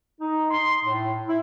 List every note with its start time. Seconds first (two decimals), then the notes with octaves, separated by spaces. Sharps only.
0.19 D#4
0.49 C6
0.84 A2
1.27 E4